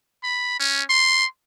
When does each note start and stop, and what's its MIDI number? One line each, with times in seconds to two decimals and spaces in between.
0.24 0.55 83
0.60 0.83 61
0.90 1.26 84